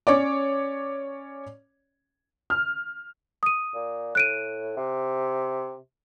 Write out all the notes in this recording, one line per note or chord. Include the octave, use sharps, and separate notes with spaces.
C#4 C#5 D5 D6
F6
D#6 D#7
A#2
A2 F#6 D7 D#7
C3